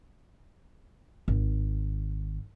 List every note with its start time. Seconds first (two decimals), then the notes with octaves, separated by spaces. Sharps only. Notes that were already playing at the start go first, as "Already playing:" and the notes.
1.28 G#1